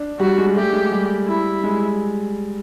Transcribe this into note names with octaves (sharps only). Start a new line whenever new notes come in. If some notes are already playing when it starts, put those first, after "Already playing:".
Already playing: D4
G3 F#4
G#3
A3 G4
G#3
G3
E4
G#3